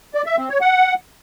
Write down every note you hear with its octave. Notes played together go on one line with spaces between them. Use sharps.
D5
E5
C4
C#5
F#5